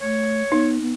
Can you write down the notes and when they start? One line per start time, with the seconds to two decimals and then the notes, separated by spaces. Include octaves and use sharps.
0.01 A3 C#5
0.52 B3 D#4
0.82 B3